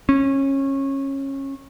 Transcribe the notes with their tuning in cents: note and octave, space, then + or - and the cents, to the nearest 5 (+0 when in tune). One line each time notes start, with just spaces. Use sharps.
C#4 -20